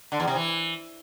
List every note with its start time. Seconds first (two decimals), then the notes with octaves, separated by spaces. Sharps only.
0.12 D3
0.20 E2
0.28 C3
0.35 E3